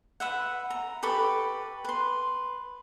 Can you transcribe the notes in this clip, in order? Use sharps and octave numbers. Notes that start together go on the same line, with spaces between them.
B4 E5 F#5
A#5
G4 A4 B4 C#6
B4 C6